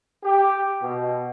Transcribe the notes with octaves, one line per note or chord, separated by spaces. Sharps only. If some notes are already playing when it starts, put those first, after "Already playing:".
G4
B2